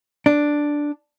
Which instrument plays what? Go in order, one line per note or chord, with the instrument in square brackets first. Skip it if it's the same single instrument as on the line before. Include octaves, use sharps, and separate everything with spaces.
[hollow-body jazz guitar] D4